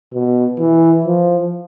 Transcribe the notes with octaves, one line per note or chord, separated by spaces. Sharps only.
B2
E3
F3